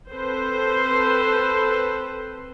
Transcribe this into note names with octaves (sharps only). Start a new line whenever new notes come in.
C4 A4 B4 C5